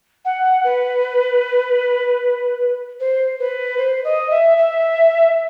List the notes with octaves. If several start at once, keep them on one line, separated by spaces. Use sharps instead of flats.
F#5
B4
C5
B4
C5
D#5
E5
E5